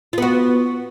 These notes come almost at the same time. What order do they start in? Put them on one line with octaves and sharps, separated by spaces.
F4 B3 F#4